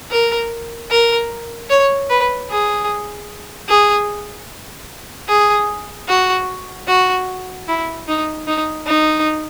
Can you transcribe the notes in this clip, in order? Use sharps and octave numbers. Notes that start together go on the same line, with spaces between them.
A#4
A#4
C#5
B4
G#4
G#4
G#4
F#4
F#4
E4
D#4
D#4
D#4